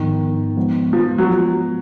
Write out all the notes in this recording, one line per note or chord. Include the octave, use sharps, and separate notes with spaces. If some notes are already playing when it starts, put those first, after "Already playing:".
Already playing: G#2 D#3 F3 B3
F3 G#3 B3
F3
F#3